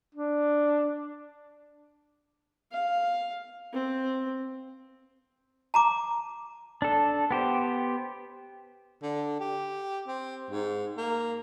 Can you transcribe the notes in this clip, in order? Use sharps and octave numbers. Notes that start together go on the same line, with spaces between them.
D4
F5
C4
A5 A#5 D6
D4 A4
B3 G4 C5
D3
G4
C4
G#2
A#3